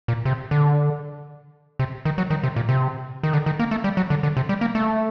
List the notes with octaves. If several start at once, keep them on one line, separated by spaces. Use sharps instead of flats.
A#2
C3
D3
C3
D#3
F#3
D#3
C3
A#2
C3
D#3
D3
D#3
A#3
A3
G3
F#3
D3
D3
C3
G3
A#3
A3